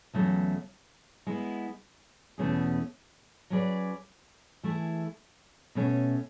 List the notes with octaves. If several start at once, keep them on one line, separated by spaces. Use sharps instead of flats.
E2 C#3 F#3 A3
G#3 B3 E4
E2 B2 A3 C#4 G#4
F#3 C#4 G#4 B4 D5
E3 A3 E4 G#4
B2 A3 C#4